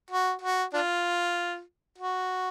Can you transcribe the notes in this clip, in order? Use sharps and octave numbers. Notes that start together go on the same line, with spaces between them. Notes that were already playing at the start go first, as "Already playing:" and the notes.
F#4
F#4
D4 F4
F#4